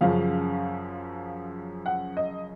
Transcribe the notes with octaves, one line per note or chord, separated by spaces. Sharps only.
F#2 C#3 F3 F5
F#5
D#5